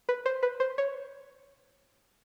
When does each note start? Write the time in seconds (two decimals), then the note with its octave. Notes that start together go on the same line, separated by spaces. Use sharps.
0.09 B4
0.26 C5
0.43 B4
0.60 C5
0.78 C#5